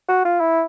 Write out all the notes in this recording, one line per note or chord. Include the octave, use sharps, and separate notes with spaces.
F#4
F4
E4